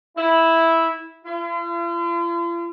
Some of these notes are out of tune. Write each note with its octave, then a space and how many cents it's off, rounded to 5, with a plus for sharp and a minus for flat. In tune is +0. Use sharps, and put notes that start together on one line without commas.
E4 -5
F4 -45